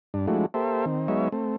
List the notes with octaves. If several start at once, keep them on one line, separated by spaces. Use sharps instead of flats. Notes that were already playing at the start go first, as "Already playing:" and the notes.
G2 D4
F3 G#3 A3 D4 E4 F#4
A#3 G4 A4 C5 E5
D#3 C4
F#3 G#3 B3 D#4 C#5 E5
A3 C4